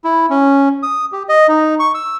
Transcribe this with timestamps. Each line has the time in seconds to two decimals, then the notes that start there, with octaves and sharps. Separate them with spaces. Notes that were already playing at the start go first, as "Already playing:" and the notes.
0.04 E4
0.30 C#4
0.83 D#6
1.12 G4
1.29 D#5
1.48 D#4
1.80 C#6
1.95 E6